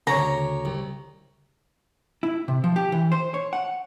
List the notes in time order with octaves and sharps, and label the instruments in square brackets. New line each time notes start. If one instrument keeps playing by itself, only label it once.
[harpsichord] D2 C#5 [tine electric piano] C#3 [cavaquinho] A#5
[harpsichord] C2
[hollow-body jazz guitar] E4
C3
F3
G4
E3
C5
C#5
F#5